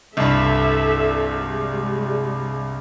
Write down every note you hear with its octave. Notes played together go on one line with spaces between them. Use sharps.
C2 G2 A4 E5
G3 G#3